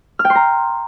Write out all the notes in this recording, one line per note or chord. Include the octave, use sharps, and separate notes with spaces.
F6
G5
C6
A#5